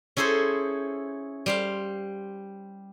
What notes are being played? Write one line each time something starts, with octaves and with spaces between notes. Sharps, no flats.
C#4 E4 G#4 A4 C5
G3 C5 F5